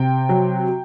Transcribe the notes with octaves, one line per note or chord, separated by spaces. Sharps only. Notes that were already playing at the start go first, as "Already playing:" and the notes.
Already playing: C3 G5
F#3